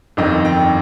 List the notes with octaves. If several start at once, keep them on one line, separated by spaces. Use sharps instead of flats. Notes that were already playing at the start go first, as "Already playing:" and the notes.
G1 F2 D#3 D#5
G5